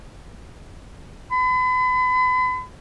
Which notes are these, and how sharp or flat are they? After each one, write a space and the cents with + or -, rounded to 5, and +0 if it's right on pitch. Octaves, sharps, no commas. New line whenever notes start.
B5 +40